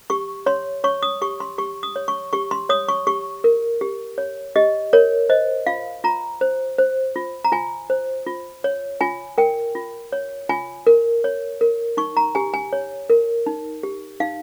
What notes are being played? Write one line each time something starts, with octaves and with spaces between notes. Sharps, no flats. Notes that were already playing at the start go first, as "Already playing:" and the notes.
G4 C#6
C#5 C6
C#5 C#6
D#6
G4 C#6
C6
G4 C#6
D#6
C#5
C#6
G4 C#6
C6
C#5 D#6
C#6
G4 C#6
A#4
G4
C#5
G4 D#5
A#4 C#5
C5 D#5
F4 F5
F4 A#5
C5
C5
F4
A#5
F4 G#5
C5
F4
C#5
F4 G#5
A#4 G5
F4
C#5
F4 G#5
A#4
C#5
A#4
D#4 C#6
A#5
G4 G#5
G#5
C#5
A#4
D#4
G4
D#4 F5